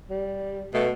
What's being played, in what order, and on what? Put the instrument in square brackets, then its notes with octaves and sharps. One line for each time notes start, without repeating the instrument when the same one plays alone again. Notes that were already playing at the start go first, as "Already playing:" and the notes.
[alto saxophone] G3
[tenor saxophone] B2 [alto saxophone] A3